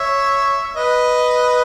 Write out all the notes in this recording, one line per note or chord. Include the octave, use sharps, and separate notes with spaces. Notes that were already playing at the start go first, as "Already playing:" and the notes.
Already playing: C#5 E5
B4 D#5